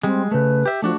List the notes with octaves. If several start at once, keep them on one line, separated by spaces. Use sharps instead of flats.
G3 G#3 C4
C#3 A3 B4
G4 E5
F3 A3 D4 F#4